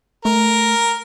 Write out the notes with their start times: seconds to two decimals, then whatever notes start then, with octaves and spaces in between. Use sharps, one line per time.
0.25 A3 A#4